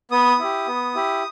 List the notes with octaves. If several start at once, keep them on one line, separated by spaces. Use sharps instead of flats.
B3 D#6
E4 G4
B3
E4 G4